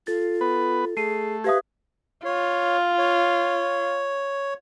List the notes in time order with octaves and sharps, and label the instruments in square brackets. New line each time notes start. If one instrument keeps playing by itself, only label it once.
[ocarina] F4 [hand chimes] A4 A6
[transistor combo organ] B3 B4
[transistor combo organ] A3 [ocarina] G#4 [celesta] C7 D#7
[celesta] G4 F5 D#6 [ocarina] B4 [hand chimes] E5 G#6
[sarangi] F4 [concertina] C#5
[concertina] C#5